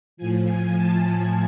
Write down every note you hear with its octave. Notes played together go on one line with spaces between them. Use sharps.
A2 F3 G#5
G#5
A5
A5